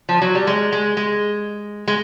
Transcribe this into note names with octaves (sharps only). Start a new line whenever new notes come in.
F3
F#3
G3
G#3
G#3
G#3
G#3